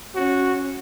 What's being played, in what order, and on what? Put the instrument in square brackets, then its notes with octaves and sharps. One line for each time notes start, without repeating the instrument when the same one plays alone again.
[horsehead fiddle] C#4 [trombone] F#4